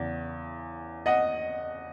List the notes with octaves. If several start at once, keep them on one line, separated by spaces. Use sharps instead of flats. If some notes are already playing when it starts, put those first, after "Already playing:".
Already playing: E2 C#3 E3
D#5 F#5